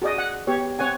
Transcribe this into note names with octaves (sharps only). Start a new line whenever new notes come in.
F#4 G#4 D5 D#5
F#5
B3 G4 C#5
C4 C#5 F#5 G#5